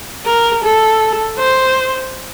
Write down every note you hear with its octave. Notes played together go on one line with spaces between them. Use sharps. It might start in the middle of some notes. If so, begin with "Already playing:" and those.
A#4
A4
C5